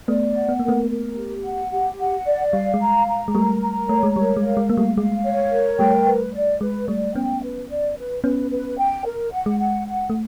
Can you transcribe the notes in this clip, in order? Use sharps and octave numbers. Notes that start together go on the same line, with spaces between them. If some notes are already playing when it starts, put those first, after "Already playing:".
A3 B3 D5
F#5
B3
A#3 A#4
A3 B3
A#4
G4
F#5
G4
F#5
D5
G3 F5
G#3
A#5
A#5
G#3
G3 A3 A#4
A#5
A3 C#5
G#3
G3 A#4
G#3
F5
G#3
A#3 F5
G3 A3
G#3 F5
C#5
A#4
G3 A3 G5
B4
D5
G#3 B4
G3 A3 D5
B3 C#4 G5
B4
D5
B4
B3 C#4 B4
B4
G5
A#4
F#5
G#3
F#5
F#5
A3